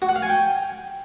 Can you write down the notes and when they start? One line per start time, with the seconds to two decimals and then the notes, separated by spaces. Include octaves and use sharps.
0.02 F#4
0.09 F#5
0.16 F5
0.22 G#5
0.29 G5